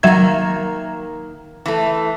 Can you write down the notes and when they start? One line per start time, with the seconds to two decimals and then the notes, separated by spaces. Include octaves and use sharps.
0.03 D#3 F#3 A#3 E5 G#6
1.66 E3 A3